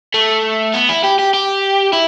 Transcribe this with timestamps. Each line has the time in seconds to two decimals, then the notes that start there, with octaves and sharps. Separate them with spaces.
0.14 A3
0.74 B3
0.89 E4
1.04 G4
1.19 G4
1.34 G4
1.93 E4